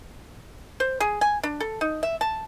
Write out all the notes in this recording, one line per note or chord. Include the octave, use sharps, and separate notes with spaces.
C5
G#4
G#5
D4
A4
D#4
E5
A5